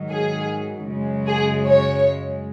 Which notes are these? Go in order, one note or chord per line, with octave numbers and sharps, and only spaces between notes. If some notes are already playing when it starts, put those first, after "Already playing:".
Already playing: G#2 D#3 F#3
G#4
F#2 C#3 G#3
G#4
C#5